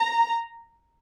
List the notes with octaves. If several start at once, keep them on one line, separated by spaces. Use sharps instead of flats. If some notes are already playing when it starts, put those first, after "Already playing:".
Already playing: A#5